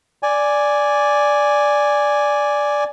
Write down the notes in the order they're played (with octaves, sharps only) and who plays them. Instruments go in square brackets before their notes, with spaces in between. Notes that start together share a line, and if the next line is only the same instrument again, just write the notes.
[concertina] D5 G#5